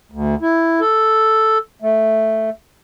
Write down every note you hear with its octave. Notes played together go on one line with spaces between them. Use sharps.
D2
E4
A4
A3